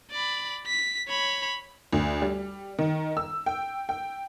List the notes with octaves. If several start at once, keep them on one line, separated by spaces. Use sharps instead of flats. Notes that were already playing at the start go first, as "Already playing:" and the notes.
D5 B5
B6
C#5 B5
D2
G3
D#3
E6
G5
G5